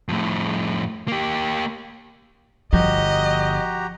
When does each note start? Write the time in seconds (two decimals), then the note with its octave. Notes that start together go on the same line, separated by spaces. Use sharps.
0.09 F2 A2
1.08 A#3 G4
2.73 G1 D3 F3 F#4 G4 D#5 A#5